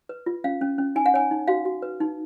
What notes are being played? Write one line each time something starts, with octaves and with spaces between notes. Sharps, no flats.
B4
F4
C#4 F5
C#4
C#4
D#4 G#5
F#5
C#5 G#5
D#4
F#4 F5
F#4
B4
D#4